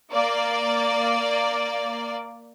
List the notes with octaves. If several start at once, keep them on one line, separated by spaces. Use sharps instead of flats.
A#3 D5